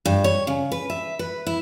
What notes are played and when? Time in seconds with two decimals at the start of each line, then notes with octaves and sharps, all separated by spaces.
0.06 G2
0.24 C#5
0.47 C#3
0.72 B4
0.90 E5
1.19 B4
1.47 E4